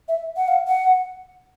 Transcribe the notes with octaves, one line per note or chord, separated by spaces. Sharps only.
E5
F#5
F5
F#5